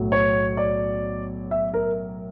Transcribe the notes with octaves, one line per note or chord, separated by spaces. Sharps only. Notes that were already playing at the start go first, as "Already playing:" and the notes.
Already playing: B1 A2 F#3
C#5
D5
E5
A#4